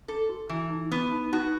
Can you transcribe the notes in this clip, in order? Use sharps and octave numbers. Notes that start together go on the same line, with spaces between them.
G#4 A4
F#4
E3 E4
D#4
B3
D#4
D#4 F#4